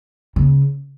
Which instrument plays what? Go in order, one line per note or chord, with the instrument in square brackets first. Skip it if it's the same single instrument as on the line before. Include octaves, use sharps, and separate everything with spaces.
[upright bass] C#3